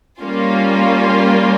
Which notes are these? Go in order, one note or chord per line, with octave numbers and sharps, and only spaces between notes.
G3 A#3 C#4 F4